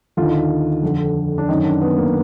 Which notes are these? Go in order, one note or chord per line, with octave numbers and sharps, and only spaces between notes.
D#2 D3 F4
D#4
F4
F2 D3
D4
F#2 D#3 D#4
D4
B3
A#3